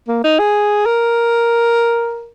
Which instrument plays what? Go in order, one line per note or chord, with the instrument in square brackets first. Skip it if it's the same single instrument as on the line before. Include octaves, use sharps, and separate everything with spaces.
[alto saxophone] A#3
D#4
G#4
A#4